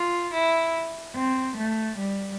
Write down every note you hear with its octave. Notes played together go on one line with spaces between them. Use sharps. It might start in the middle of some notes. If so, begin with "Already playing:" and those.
Already playing: F4
E4
C4
A3
G3